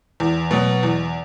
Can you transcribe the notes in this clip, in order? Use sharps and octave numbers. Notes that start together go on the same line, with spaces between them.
E2
B2 F#3
E2